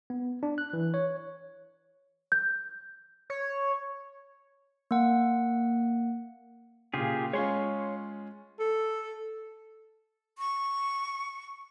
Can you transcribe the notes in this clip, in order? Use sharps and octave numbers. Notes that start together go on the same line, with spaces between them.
B3
D4
F#6
E3
C#5
G6
C#5
A#3 F#5
A#2 C#3 F4 G4 G#4
G#3 C#4 F4 C#5 C6 C#6
A4
C#6